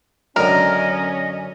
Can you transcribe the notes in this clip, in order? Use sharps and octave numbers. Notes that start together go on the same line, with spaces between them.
F#2 D3 C#4 A#4 D#5